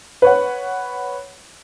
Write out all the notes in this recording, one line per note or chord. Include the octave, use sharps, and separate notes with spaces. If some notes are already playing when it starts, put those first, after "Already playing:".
B4 C#5 F#5